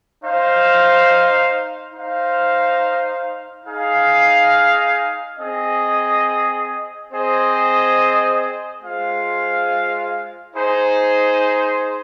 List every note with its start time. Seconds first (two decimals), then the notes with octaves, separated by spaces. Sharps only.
0.23 D#4 C5 F5
1.95 D#4 C5 F5
3.66 D#4 G#4 F5
5.39 C4 G#4 D#5
7.11 C4 G#4 C5 D#5
8.83 G#3 F4 C5 F5
10.55 D#4 G#4 C5